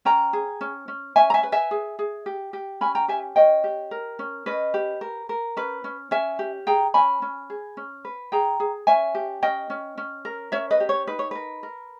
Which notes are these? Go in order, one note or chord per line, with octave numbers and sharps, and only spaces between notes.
C#4 G5 A#5
G#4
C#4
C#4
C#4 E5 G#5
A#5
E5 G#5
B4
E5 G#5
G#4
G#4
G4
G4
C#4 G#5 B5
G5 A#5
G4 E5 G#5
C#4 D#5 G5
G4
A#4
C#4
C#4 B4 D#5
G4
A#4
A#4
C#4 B4
C#4
C#4 E5 G#5
G4
G#4 G5 A#5
C#4 G#5 B5
C#4
G#4
C#4
B4
G#4 G5 A#5
G#4
C#4 E5 G#5
G4
C#4 D#5 G5
C#4
C#4
A#4
C#4 C#5 E5
B4 D#5
G4
C#5
D#4 B4
C#5
A#4 B4
A#4